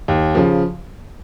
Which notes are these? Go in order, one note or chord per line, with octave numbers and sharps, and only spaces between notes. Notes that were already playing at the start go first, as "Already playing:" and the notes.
D#2
C#3 F3